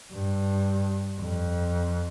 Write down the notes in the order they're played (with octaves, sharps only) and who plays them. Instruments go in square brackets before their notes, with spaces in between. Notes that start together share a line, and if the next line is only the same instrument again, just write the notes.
[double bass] G2
F2